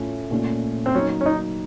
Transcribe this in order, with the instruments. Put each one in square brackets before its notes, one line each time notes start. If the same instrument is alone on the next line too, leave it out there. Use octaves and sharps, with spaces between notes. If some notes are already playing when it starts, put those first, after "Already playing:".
Already playing: [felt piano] A2 A3 C#4 F4
A#2 A3 C#4
[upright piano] C4
[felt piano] F#3 A#3 D#4 [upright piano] C#4
[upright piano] C#4
D#4